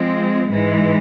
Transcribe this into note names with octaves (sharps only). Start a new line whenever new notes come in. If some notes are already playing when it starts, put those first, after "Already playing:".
Already playing: F3 G#3 C4
G#2 E3 G#3